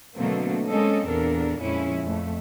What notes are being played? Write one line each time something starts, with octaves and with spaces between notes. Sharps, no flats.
B2 D3 F#3 A3 A#3 C4
G#3 A#3 C4 C#4 A4 D#5
E2 A#2 D4 A4 A#4
F2 A#2 F3 G#3 C#4 E4
F2 A3